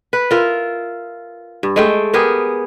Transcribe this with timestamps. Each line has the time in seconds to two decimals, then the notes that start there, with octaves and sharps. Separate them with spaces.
0.13 B4
0.31 F4 A#4 E5
1.63 G2
1.76 G#3 A3 G5
2.13 B3 G4 G#4 A#4